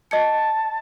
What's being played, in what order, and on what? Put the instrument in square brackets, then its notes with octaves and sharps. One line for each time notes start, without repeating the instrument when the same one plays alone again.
[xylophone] D#5 G#6 C#7 [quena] A5